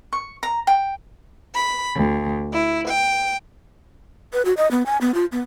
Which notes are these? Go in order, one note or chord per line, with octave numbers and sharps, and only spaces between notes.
C#6
A#5
G5
B5
D2
E4
G5
B4
F#4
D#5
B3
G#5
B3
F4
B3